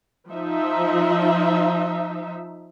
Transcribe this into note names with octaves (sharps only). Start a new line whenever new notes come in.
F3 D#4 E5